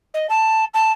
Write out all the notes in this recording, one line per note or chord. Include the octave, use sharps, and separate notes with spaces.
D#5
A5
A5